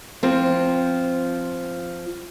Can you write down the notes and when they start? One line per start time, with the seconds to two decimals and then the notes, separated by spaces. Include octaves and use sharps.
0.23 F3 C4